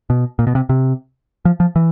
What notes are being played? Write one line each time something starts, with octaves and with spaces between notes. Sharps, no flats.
B2
A#2
B2
C3
C3
F3
F3
E3